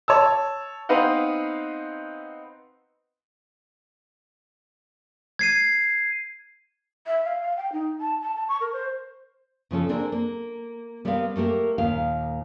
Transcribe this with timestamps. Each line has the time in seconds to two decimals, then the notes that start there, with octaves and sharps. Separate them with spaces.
0.08 C#5 A5 E6
0.89 B3 C4 D#4 B4 F5 F#5
5.39 G#6 C7 D#7
7.07 E5
7.24 F5
7.41 F5
7.57 G5
7.73 D#4
8.01 A5
8.22 A5
8.36 A5
8.49 C#6
8.61 A#4
8.73 C5
9.71 C#3 F3 C#4 A4
9.89 A#3 C4 D4 G#4 A#4
10.12 A#3
11.05 G3 B3 C4 A#4 E5 F5
11.36 A3 A#3 G4 A#4
11.78 D#2 A#2 D#4 F5